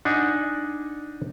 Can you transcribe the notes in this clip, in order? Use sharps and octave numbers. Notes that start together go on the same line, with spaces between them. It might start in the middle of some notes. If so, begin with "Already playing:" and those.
D4 D#4 F#5 G#5